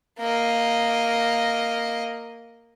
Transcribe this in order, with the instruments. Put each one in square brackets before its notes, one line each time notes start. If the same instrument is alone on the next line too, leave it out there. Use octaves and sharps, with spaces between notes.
[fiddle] A#3 D#5